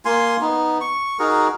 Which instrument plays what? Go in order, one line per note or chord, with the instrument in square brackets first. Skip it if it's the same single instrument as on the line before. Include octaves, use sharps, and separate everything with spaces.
[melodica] A#3 F4 G#5 C6
B3 D#4
C#6
D#4 F#4 G#4 A#4